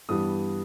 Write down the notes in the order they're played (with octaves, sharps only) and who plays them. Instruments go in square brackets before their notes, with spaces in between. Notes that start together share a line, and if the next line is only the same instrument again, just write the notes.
[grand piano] G2 E3 G3 B3 D#6